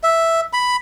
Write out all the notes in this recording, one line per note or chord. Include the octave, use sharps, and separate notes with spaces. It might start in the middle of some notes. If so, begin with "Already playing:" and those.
E5
B5